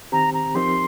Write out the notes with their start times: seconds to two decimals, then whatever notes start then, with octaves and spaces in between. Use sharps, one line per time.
0.12 D#3 C4 G4 C5 A#5
0.34 A#5
0.55 F3 C4 D#4 G4 A#4 C6